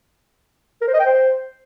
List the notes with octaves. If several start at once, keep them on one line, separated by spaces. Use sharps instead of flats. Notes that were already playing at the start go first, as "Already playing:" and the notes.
A#4
C5
D#5
G5
C5